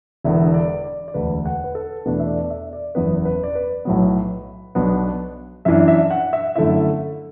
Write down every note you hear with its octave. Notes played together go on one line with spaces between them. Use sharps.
E1 E2 D3 B3 E5
D5
D5
D5
E1 D2 D3 B4
F#5
B4
A4
E2 B2 A3 D4 B4
E5
D5
D5
E5
D5
F#1 E2 E3 B3 B4
B4
D5
B4
B1 A2 F#3 B3
B1 B2 B3 D4
F#2 E3 D4 E5
E5
F#5
E5
F#2 D3 A3 E4 E5